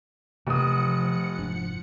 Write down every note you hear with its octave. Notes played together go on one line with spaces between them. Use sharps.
F1 C3 E3 F3 A3 F#5 D#6 C#7
F1 G#2 D4